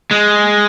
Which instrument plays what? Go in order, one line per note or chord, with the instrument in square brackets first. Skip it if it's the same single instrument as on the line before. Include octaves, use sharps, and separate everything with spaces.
[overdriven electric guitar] G#3